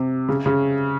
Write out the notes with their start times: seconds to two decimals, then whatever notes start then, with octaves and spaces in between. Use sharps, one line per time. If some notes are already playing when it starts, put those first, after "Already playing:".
Already playing: C3
0.29 C#3
0.46 C#3